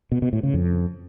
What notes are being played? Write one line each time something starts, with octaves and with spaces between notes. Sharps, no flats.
B2
B2
A2
C#3
F2